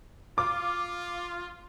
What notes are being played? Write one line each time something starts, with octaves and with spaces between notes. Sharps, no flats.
F4 D6